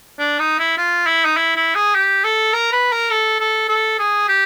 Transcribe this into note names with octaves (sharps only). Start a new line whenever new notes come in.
D4
D#4
E4
F4
E4
D#4
E4
E4
G#4
G4
A4
A#4
B4
A#4
A4
A4
A4
G#4
G4